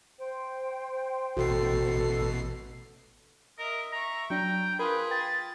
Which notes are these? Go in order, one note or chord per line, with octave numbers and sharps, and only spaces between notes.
C5 G5
A1 B2 F#4 A4 C7
A#4 D#5 E5
E5 A#5 C#6
F#3 D4 G5 A#5
F4 G#4 A#4 B4 B5
G5 A6